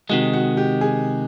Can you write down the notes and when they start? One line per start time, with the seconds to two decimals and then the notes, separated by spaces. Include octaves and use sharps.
0.09 C3 D#3 G#3 F#4
0.33 F#4
0.57 G4
0.81 G#4